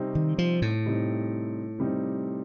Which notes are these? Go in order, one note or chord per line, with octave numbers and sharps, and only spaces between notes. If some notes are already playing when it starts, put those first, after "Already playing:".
Already playing: C3 G3 C4 D#4
D#3
F3
A2
C3 G3 C4 D#4
C3 G3 C4 D#4